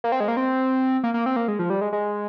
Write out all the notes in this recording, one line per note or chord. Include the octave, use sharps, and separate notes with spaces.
A#3
C4
G#3
A#3
C4
A#3
A#3
C4
A#3
G#3
F3
G3
G#3
G#3